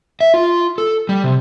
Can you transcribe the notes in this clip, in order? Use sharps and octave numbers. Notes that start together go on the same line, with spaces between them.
E5
F4
A4
G3
C3